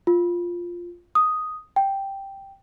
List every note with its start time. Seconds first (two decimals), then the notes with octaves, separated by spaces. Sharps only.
0.07 F4
1.15 D#6
1.76 G5